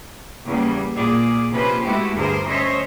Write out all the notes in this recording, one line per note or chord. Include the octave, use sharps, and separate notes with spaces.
E2 C#3 G3 A#3
A#2 G#4 D5
C3 F3 A#3 C#4 B4 C5
G#3 A3 B3 E4 F#4 G4
D2 G2 G#4 A#4 C5
D2 C#4 C5 C#5 D#5 E5